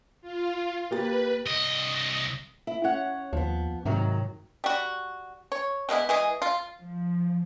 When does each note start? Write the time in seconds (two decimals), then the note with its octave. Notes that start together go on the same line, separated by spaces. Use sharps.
0.21 F4
0.91 A#3 G4 B4 A6
1.46 C2 D#5
2.67 E4
2.84 C#4 C#5 F#5
3.33 D#2 F3 B3
3.85 G#2 C3 D#3 F#3
4.64 G3 F#4
5.52 C#5
5.89 E3 G#3 B3 E4
6.09 E3 G#3 G#4
6.42 F4
6.81 F3